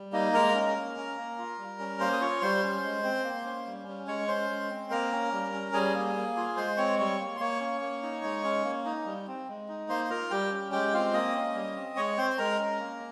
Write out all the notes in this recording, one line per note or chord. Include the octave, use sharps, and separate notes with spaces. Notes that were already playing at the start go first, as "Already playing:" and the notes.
Already playing: G3
A#3 D#4 D#5
G#3 A#4 A#5
C#4
A#3
C#4
A#3
F4
G3
C#4
A#3 C5 C6
D#6
F4 C#5 C#6
G3 C5 C6
C#4
G#3
C4
A#3
C#4
G3
C#4
G#3 C#5 C#6
C#4 C5 C6
G#3
C4
A#3 A#4 A#5
C#4
G3
C#4
G3 G#4 G#5
A#3
A#3
F4
G#3 C5 C6
C4 C#5 C#6
G3 C#5 C#6
A#3
C6
A#3 C#5 C#6
C#4
A#3
D#4
G#3
C#4
A#3
D#4
G3
C4
G#3
D#4
A#3 C5 C6
C6
F4 A#4 A#5
G3 G4 G5
C#4
G#3 G4 G5
C4 F4 F5
A#3 D#5 D#6
C#4
G3
C4
G#3 C#5 C#6
C4 C5 C6
C6
G#3 A#4 A#5
C#4
A#3